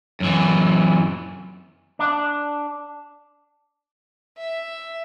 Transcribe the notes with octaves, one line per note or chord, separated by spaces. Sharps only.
F#2 E3
D4
E5